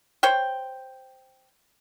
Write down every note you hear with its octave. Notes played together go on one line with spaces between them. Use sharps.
C5 C#5 G5